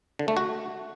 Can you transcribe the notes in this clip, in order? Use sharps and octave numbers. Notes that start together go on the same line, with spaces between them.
D3
A3
F#4